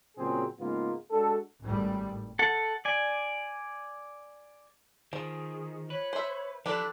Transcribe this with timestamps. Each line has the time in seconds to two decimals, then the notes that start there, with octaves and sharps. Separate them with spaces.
0.17 A#2 C#3 F#3 C4 G#4
0.59 G#2 C#3 G#3 A#3 B3 F4
1.11 G#3 D4 F#4 A4
1.61 G#1 A2 G3
2.39 A4 F#5
2.85 D5 G#5
5.13 D#3 F3 G#4
5.90 B4 C#5
6.13 C5 E5
6.66 F3 D4 E4 G4 A4 B4